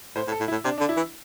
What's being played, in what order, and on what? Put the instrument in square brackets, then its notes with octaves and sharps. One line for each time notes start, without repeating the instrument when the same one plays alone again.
[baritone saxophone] A2 [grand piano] C5
[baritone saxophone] A2
[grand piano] A4
[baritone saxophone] A2
[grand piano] E4
[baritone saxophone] A2
[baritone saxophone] C3 [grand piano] D4
[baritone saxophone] D3 [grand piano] D4
[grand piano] E4
[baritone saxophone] E3